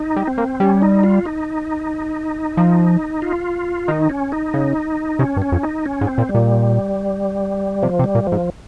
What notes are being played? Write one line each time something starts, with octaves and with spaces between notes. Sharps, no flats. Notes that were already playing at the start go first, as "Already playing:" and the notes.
Already playing: D#4
G3
C4
A#3
G3 C#4
D#4
F4
D#4
F3
F4
D#3 D#4
C#4
D#4
C#3
C3 C#4
G2
C#4
F2
D#4
C#4
G#2
C4
A#2
G3
A#2
C3 F3
C3
G3
A#2
F3
G#2